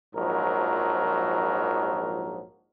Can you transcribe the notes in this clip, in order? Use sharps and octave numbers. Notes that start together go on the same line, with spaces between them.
A#1 G#2 F3 F#3 A#4